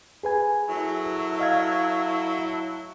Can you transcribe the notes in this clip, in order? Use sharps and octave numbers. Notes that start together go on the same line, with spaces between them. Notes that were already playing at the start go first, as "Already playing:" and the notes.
G#4 B4 G#5
F#3 A3 E4
D#5 F5 G#6